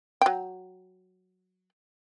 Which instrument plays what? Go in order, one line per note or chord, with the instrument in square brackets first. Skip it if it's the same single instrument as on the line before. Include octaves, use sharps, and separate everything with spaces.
[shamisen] F#3 G5